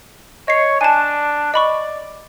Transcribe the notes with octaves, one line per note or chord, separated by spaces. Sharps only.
C#5 D#5 C7
D4 G#5 A5
D5 D#5 B5 C#6